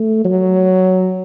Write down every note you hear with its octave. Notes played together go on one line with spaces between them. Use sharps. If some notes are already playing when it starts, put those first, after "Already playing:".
Already playing: A3
F#3